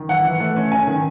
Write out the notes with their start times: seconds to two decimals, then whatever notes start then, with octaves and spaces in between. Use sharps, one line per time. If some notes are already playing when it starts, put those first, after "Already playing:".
Already playing: D#3
0.09 E3 F#5
0.25 E3
0.40 A3
0.56 C#4
0.72 C#4 G#5
0.87 D#3